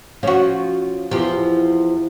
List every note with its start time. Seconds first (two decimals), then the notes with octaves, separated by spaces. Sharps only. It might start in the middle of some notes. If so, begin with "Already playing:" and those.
0.23 F3 C#4 F#4 C#5
1.11 E2 F3 G4